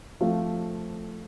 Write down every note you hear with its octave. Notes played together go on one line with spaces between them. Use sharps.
F3 A3 C4 F4